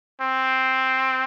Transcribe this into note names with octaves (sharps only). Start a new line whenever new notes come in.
C4